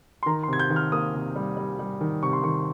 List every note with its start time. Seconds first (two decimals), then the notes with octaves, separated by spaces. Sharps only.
0.23 C6
0.26 D#3 A#5
0.43 C6
0.48 C3 G#6
0.59 G6
0.70 D#3
0.76 F6
0.92 A#3 D#6
1.14 C3
1.36 G3
1.57 G3
1.79 G3
2.01 D#3
2.23 C3 C#6
2.33 C6
2.43 D#3 C#6